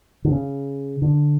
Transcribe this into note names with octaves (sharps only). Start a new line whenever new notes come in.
D3
C#3
D3